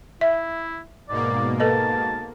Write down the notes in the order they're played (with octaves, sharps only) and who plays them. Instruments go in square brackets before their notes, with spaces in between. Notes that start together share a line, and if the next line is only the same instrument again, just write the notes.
[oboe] E4 [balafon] E5
[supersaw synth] G#2 B2 A#3 [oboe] D5
[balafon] A4 B4 D#5 [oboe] A5